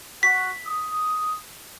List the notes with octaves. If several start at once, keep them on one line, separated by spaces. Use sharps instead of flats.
F#4 B6
D#6